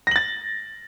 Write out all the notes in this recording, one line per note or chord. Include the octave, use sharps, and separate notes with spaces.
A6 A#6 F#7